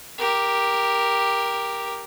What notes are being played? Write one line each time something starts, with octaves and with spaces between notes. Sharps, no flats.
G4 A#4